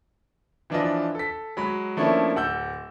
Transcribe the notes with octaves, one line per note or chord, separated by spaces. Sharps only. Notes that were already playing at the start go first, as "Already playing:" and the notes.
E3 F3 D4 F4 B4 D#5
A4 B6
F#3 G#3 B5
F3 A3 A#3 C#4 D4 E4
D1 F#5 E6 G6